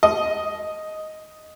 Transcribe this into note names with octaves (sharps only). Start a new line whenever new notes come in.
D#5